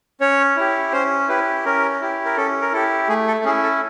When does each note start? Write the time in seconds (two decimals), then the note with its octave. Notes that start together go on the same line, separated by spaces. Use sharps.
0.20 C#4 C#5
0.57 E4 G4
0.92 C#4 C5
1.28 E4 G4 B4
1.65 C#4 A#4
2.01 E4 G4
2.25 A#4
2.36 C#4 A4
2.61 A#4
2.72 E4 G4 A4
3.09 A3 G#4
3.27 A4
3.44 C#4 E4 G#4
3.63 A4